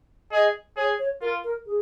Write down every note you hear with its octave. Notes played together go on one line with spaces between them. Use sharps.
G#4 D#5
G#4 C#5
C#5
F4 A#4
A#4
G#4